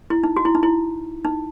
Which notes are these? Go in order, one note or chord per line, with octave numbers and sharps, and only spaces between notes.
E4
D#4
F#4
E4
D#4
E4
D#4